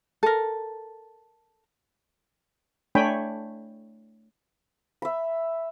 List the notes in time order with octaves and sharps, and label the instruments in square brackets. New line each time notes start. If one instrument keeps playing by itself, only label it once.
[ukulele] A4 A#4
[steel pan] A3 D4 C#5 G5 G#5 B5
[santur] E5 B5